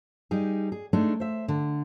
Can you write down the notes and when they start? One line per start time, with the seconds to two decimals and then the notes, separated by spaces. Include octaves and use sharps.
0.31 G3 D#4 G#4
0.72 G#4
0.93 G#3 A3 D4 D#4
1.20 C5 E5
1.48 D3